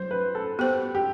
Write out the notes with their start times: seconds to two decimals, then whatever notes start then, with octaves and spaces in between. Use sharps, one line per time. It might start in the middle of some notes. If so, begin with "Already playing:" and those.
Already playing: F#3 C5
0.11 B4
0.35 A4
0.59 B3 F#4 G4 C5
0.95 G4